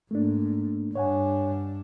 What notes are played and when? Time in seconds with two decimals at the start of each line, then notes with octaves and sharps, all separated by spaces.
0.11 G#2 A3 A#3 D4
0.95 G2 D4 C#5 F#5 G#5